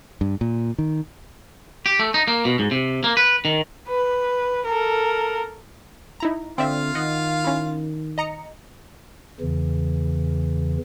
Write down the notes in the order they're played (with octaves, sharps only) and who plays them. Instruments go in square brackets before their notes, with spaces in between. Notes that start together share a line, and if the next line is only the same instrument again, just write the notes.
[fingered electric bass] G2
A#2
D#3
[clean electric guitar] G4
A3
D#4
A#3
B2
G#2
C3
A#3
B4
D#3
[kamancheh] B4
A4 A#4
[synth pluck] D#4 E4 A#5
[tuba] D3 [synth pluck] C4 D5 E5 [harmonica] F4 F5
[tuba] D#3 [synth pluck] D#5 F#5
[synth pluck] C#4 E4
D#5 A#5 C#7
[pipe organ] E2 C#3 E3